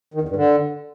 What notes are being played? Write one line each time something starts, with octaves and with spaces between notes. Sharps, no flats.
D#3
E2
G2
D3